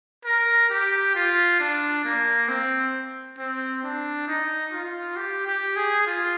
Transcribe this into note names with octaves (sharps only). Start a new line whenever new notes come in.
A#4
G4
F4
D4
A#3
C4
C4
D4
D#4
F4
G4
G4
G#4
F4